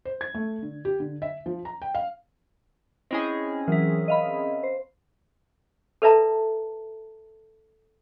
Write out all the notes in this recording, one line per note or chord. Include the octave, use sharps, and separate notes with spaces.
C5
G#6
A3
D3
G4
D3
E5
F3
A#5
G5
F5
C4 C#4 E4 G#4 D#5
E3 F#3 A#4 E5
D#5 F5 B5
C5
A4 B4 D5 E5 A5 A#5